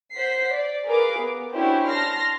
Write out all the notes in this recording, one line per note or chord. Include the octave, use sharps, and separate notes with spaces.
C5 F#5 B6 C7
D5
G#4 A#4 B4 F5 D6
B3
C#4 D4 E4 F#4 G4 C5
A5 C6 F6 A#6